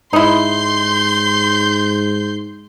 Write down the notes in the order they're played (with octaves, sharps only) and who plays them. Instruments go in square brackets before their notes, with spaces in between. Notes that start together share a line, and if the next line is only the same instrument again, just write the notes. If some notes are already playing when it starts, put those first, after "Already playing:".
[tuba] G#2 [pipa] D#4 E4 [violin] C6 G6